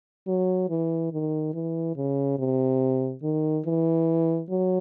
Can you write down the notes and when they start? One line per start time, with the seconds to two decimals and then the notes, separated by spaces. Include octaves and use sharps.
0.27 F#3
0.69 E3
1.12 D#3
1.54 E3
1.96 C#3
2.38 C3
3.22 D#3
3.66 E3
4.49 F#3